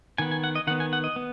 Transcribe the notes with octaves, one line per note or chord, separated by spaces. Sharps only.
D#3 B3 G#5
G#5
F#5
D#5
D#3 B3 F#5
G#5
F#5
D#5
B3